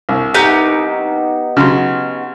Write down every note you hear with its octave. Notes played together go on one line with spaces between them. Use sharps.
C2
B3 D#4 G4
C#3 F#3 C6